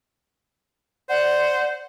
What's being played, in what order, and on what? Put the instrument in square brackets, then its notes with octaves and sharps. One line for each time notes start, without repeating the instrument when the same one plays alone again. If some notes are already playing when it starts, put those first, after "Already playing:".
[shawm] C5 [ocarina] D5 [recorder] F#5